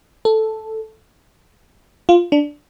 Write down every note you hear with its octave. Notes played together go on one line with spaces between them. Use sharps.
A4
F4
D4